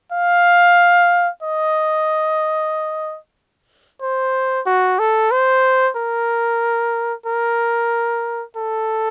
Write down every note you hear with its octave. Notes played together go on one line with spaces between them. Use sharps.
F5
D#5
C5
F#4
A4
C5
A#4
A#4
A4